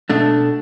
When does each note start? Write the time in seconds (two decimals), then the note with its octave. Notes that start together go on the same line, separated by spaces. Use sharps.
0.10 B2 A3 D4